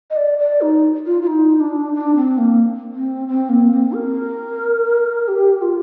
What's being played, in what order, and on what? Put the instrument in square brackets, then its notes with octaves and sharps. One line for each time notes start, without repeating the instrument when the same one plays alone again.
[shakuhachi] D#5
D5
D5
D#4
F4
F4
D#4
D4
D4
C4
A#3
C4
C4
A#3
C4
A#4
G4
F4